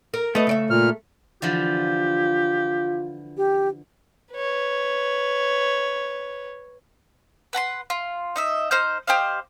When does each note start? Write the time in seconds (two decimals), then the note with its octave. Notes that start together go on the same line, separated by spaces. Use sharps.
0.14 A#4
0.35 A3 B3 D#5
0.47 C#3 D5 E5
0.70 A#2 F6
1.42 D3 E3 F3 F4 G4
3.37 G4
4.34 B4 C#5
7.53 B4 F#5 A#5 C6
7.90 F4
8.36 D#4 D#5 E5
8.71 D#4 C5 F6 G6
9.07 G4 C5 D#5 F5